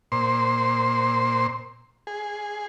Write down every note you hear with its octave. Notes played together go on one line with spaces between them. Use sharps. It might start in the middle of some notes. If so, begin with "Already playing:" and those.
A#2 C5 C6
G#4